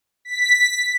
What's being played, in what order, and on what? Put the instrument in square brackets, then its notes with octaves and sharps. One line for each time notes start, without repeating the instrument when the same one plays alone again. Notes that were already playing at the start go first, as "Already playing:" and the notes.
[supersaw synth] B6